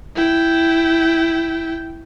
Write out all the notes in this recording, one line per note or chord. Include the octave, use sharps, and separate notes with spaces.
E4 G5